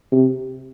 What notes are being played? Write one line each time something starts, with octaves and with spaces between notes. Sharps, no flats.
C3